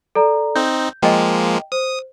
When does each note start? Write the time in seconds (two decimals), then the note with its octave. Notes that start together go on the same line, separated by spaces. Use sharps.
0.15 A4 D5 A#5
0.55 C4 D#4 G6
1.03 F3 G#3 A#3 D#5 G5
1.72 C5 D#6